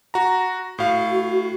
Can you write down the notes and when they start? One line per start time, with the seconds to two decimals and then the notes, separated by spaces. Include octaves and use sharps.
0.14 F#4 A#5
0.78 A2 F#4 F5